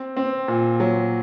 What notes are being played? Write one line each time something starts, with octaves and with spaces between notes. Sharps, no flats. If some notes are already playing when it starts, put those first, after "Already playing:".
Already playing: C4
C4
A#2
F#3